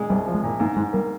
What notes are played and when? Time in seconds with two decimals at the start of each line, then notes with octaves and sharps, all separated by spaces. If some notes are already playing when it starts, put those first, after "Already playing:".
Already playing: A#2 G#3
0.09 C2 G3
0.27 F3
0.35 G#3
0.43 A#2
0.60 G#2 A#3
0.76 G#2 G#3
0.93 G3 A#3